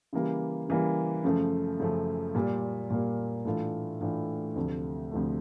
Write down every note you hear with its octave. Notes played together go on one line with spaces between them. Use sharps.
C#3 E3 G3 A#3
C#3 E3 G3 A#3
F#2 C#3 F3 A3
F#2 C#3 F3 A3
A#2 G3 A#3
A#2 G3 A#3
A2 E3 A3 D4 F4
A2 E3 A3 D4 F4
D2 C3 F3 A3
D2 C3 F3 A3